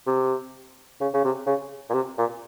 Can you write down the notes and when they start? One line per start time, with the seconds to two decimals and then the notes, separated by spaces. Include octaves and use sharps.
0.07 C3
1.01 C#3
1.14 C#3
1.24 C3
1.47 C#3
1.90 A#2
1.94 C3
2.18 A#2